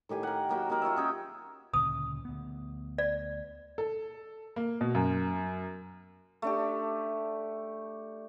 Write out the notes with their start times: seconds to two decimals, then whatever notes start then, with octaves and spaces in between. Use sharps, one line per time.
0.09 A2 D#3 G4 G#5
0.23 A#4 F#5
0.49 F#3 A#3 G4 G5
0.70 A#3 D#4 A#4 F#5
0.82 F4 C#5 D#5 E5
0.97 C#4 G#4 G5
1.74 D2 A#2 C#3 D#6
2.25 D2 B3
2.98 D5
3.78 A4
4.56 A#3
4.81 B2
4.95 F#2
6.42 A3 D4 G4